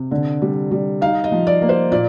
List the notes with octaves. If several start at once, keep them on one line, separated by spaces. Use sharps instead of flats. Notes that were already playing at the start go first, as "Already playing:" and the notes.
Already playing: C3
D3
G3
G3
D#4 F5
D#5
F3
D5
A#3
C5
A#2 D5